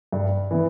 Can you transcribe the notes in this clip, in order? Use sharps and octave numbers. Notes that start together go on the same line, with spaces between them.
G2
E3 B3